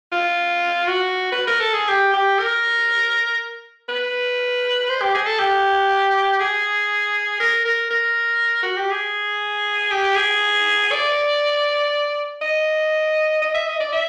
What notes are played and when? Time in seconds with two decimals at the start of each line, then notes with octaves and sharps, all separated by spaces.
0.12 F4
0.88 F#4
1.32 B4
1.47 A#4
1.60 A4
1.74 G#4
1.88 G4
2.14 G4
2.39 A#4
3.89 B4
4.89 C5
5.02 G4
5.14 G#4
5.26 A4
5.39 G4
6.40 G#4
7.40 A#4
7.65 A#4
7.90 A#4
8.63 F#4
8.77 G4
8.91 G#4
9.91 G4
10.16 G#4
10.92 D5
12.42 D#5
13.42 D#5
13.54 E5
13.68 D#5
13.80 D5
13.92 E5